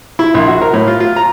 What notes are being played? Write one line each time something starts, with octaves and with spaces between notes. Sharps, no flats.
E4
A#1
F#4
A#4
A2
F4
F4
A#5